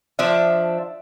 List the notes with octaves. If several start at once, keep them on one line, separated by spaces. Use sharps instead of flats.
F3 D4 E5